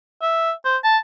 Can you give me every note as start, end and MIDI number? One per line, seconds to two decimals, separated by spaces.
0.22 0.52 76
0.65 0.77 72
0.84 0.98 81